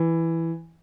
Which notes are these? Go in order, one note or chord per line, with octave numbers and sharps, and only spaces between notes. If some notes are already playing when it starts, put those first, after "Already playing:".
Already playing: E3